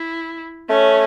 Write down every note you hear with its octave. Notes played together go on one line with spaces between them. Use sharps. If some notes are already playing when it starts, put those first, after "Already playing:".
Already playing: E4
A3 C#4